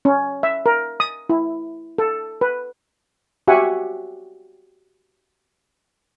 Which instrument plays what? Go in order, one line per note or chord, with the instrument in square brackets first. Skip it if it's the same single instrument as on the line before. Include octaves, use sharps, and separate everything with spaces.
[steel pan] C#4
E5
A#4
D#6
E4
A4
B4
F#4 G4 E5 F#5 G#5